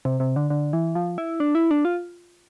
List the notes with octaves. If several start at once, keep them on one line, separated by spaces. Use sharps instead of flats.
C3
C3
D3
D3
E3
F3
E4
D4
E4
D4
F4